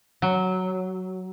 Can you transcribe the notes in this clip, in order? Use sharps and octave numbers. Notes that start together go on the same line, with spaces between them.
F#3